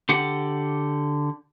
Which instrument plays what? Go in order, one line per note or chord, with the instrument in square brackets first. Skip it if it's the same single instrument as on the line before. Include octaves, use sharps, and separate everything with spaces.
[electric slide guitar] D3 G4 F#5